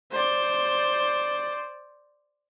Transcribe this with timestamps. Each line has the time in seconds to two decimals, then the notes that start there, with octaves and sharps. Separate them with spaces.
0.12 C5 D5